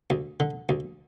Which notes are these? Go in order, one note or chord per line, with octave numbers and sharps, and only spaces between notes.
D2
D3
D2